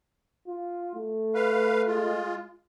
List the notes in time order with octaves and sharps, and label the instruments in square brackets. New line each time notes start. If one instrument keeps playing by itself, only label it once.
[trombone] F4
A3
[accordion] B4 F5
G#3 F4